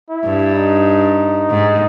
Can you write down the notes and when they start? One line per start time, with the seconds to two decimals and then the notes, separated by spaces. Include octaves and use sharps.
0.09 E4
0.25 G2
0.56 D#4
1.50 G#2